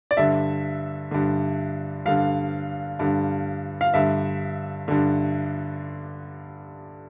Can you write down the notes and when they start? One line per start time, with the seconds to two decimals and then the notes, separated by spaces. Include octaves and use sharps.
0.11 D5
0.17 G2 D3 E5
1.11 G2 D3
2.06 G2 D3 F5
2.99 G2 D3
3.81 F5
3.94 G2 D3 E5
4.88 G2 D3